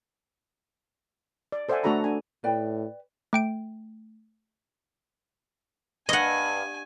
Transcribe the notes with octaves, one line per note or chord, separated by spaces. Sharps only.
D5
A4 C5 D5 E5 F#5 G#5
A3 D4 F#4 A4 A#5 B5
D4 G#5
A2 B4 D5 G5
A3 G5 D7
G2 D#5 F#5 G#5